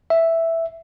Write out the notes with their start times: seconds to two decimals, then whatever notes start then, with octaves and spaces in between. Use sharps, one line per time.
0.10 E5